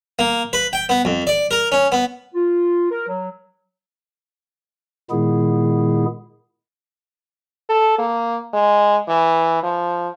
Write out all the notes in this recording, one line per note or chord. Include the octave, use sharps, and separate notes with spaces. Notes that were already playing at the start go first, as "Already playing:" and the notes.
A#3
B4
G5
B3
F2
D5
A#4
C#4
B3
F4
A#4
F#3
A#2 D#3 G#3 B3 E4 G#4
A4
A#3
G#3
E3
F3